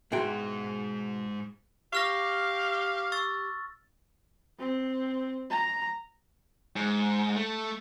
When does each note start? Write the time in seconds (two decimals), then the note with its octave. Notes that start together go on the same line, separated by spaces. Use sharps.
0.12 G#2 B2 G#3 E4 F#4 G#4 E5 G5
1.93 G4 F5 C#6 F6 A#6
3.12 C#6 E6 A6
4.59 C4
5.50 A#5
6.76 G#2
7.36 A3